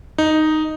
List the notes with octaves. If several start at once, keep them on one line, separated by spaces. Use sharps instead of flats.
D#4